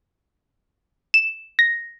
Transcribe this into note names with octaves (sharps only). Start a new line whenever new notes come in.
E7
A#6